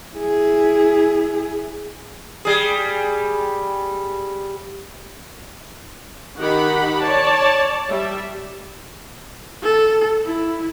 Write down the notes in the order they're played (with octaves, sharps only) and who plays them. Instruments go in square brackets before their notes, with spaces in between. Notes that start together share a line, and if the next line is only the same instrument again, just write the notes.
[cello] E4 G#4
[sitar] G3 G#4
[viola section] D#3 D#4 G4 F#5 B5
C#5 D5 A5
G3 E5
[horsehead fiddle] A4
E4